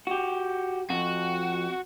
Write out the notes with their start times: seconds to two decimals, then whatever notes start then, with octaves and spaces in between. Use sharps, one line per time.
0.07 F#4 G4
0.90 F2 F#4